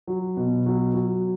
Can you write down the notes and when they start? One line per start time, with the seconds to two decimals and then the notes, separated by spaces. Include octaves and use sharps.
0.07 F#3
0.37 B2
0.66 F#3
0.94 F#3